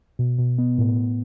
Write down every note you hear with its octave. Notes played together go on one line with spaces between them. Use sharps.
B2
B2
B3
A2
A2